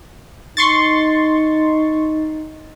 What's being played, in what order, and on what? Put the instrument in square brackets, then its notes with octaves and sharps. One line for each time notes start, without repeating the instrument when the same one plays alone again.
[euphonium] D#4 [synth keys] C6 C#6 A6